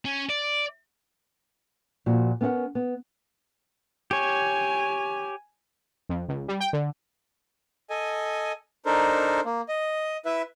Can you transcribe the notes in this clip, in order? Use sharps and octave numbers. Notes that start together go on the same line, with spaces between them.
C#4
D5
A#2 F3 F#4
B3 C#4 A#4 F5 F#5
B3
G4 C#5 G#5
F2
C#2
G3
G5
D3
A4 D#5 G#5
D4 D#4 A4 A#4 C5
A#3
D#5
E4 B4 E5